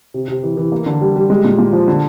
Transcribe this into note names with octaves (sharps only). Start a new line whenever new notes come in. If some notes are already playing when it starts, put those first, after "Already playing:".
C3
C3
E3
E3
A#3
D3
G3
G3
G#3
A#2
A#2
F3
D3